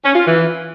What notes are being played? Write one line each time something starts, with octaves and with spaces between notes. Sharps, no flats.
C#4
F4
E3